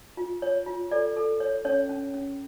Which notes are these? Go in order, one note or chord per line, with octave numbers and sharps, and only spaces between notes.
F4
C#5
F4
A4 D5
A4
C#5
C#4 C#5
C#4
C#4